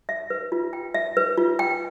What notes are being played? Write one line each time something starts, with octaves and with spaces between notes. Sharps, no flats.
E5
B4
F4
G5
E5
B4
F4
G5